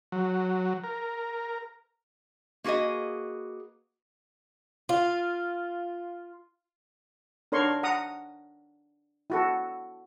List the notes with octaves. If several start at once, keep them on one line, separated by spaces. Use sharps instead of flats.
F#3
A#4
A#3 F#4 G#4 B4 D#5
F4
D4 A#4 C#5 C6 C#6
F#5 A#5 D#6
E4 F#4 A4